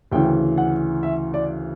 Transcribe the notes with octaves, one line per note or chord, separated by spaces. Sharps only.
D2 C#3 E3 G5
F#5
E5
D5